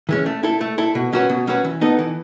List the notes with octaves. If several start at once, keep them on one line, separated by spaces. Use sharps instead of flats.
E3 G#3 C#4
A3
E4 A4
A3
E4 A4
B2
F#3 C#4 F#4 B4
B2
F#3 C#4 F#4 B4
E3
B3 D#4 A4
E3